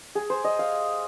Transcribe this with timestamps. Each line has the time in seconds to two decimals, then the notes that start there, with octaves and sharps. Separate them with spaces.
0.15 G#4
0.30 C5
0.44 D#5
0.59 F5